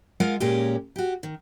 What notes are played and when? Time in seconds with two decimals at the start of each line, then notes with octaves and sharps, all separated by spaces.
0.20 G#3 F4 A#4 F5 F#5
0.40 A#2 G#3 A#3 C#4 G4
0.96 F#4 G4
1.23 D#3